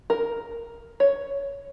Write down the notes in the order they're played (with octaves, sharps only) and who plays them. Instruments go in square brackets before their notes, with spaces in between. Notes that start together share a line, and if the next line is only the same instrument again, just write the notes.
[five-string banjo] A#4
C#5